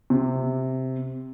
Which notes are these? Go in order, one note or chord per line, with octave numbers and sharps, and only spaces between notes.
C3